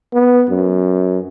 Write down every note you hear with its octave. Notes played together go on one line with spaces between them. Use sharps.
B3
F#2